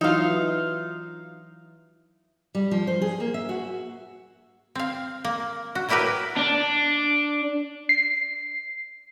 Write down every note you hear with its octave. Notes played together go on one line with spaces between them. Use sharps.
E3 F#3 D#4 F4 E5 F5
G3
F3
C5
G#4
A#3
E5
F#4
C4 F5
A#3
F#4
A2 F#3 E4 G4 A#4 B4
D4
C7